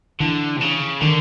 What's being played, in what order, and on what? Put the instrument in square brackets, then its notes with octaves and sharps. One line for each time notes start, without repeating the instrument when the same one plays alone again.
[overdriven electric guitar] D3 [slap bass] E3
[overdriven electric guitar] C3
C#3
[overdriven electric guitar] D3 [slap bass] D#3